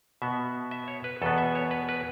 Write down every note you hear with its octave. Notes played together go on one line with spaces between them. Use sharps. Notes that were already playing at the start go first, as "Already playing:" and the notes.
B2 B3 E5
E5
C#5
B4
E2 B2 B3 A4
E5
C#5
B4
B4